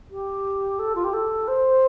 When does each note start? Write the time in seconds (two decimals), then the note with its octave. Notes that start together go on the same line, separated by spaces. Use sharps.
0.10 G4
0.79 A4
0.95 F4
1.04 G4
1.13 A4
1.47 C5